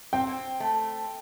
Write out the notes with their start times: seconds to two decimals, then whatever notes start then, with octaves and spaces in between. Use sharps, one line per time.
0.13 C4 G5
0.60 A3